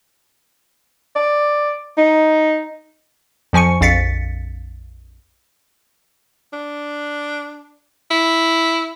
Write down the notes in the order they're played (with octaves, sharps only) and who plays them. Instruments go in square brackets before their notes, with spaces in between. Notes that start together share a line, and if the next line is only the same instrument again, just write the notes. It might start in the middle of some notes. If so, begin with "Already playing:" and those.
[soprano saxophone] D5
D#4
[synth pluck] F2 F3 G#5 C#6 C#7
A#1 F2 F5 A6 B6 C#7
[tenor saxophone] D4
E4